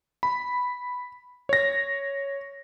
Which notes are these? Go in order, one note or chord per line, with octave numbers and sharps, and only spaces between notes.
B5
C#5 A#6